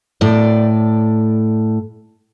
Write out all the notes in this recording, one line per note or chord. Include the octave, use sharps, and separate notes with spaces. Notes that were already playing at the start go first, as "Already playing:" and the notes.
A2 D5